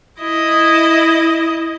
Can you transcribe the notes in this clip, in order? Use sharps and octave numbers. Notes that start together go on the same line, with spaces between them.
E4 D#5